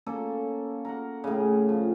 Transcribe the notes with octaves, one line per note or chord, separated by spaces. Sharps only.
A#3 C#4 A4
A#4 F#5
A2 C#3
F3